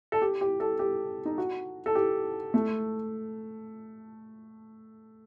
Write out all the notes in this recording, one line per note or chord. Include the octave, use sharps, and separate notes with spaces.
A4
G4
G4
A4
G4
D#4
F#4
A4
G4
A3